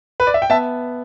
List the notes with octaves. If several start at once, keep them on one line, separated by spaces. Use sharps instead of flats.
B4
D5
E5
G5
B3 E5 A5